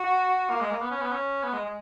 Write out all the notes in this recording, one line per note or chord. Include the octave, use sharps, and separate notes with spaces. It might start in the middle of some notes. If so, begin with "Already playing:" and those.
Already playing: F#4
A#3
G#3
A#3
B3
C#4
B3
C#4
B3
G#3
G#3